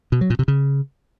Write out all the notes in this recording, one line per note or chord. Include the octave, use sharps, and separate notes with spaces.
B2
F#3
A#2
C3
C#3